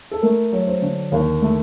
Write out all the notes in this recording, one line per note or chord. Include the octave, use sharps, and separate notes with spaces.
A4
A3 A#4
F#3
C5
D3
D#2
A3